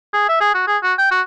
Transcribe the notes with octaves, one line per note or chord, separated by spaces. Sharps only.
G#4
E5
G#4
F#4
G#4
F#4
G5
F#4